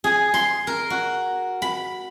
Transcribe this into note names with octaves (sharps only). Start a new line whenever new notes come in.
G#4
C6
A#4
F#4
B5